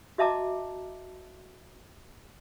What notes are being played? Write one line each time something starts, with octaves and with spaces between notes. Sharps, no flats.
F#4 D#5 E5 A5 A#5 D6